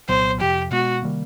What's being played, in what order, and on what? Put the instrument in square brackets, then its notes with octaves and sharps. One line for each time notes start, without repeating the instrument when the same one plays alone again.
[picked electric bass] C2 A#2 F#3 B3 [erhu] C5
[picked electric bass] F2 C3 F3 [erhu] G4
[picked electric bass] B2 G#3 B3 [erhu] F#4
[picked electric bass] C3 D#3 G3 A#3